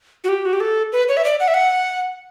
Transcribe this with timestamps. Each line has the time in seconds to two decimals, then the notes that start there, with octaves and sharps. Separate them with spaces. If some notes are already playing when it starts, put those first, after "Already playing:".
0.24 F#4
0.29 G4
0.45 F#4
0.53 G4
0.60 A4
0.92 B4
1.08 C#5
1.17 E5
1.25 D5
1.40 F#5
1.48 E5
1.54 F#5